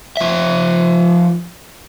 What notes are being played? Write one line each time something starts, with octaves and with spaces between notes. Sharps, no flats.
F3 E5